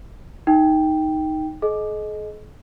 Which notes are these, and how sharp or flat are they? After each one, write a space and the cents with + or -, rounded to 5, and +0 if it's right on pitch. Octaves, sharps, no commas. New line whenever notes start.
D#4 +5 G5 +0
G#4 +45 D#5 +0